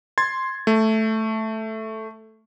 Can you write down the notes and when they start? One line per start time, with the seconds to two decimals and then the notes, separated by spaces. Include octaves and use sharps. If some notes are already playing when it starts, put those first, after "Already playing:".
0.18 C6 G#6 A6
0.67 A3